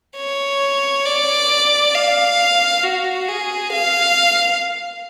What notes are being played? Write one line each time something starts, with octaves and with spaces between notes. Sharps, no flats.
C#5
D5
F5
F#4
G#4
F5